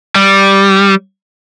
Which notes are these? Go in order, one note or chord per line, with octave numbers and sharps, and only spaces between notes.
G3